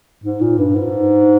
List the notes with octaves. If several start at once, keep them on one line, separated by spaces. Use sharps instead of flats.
G#2
A#2
G2
G#2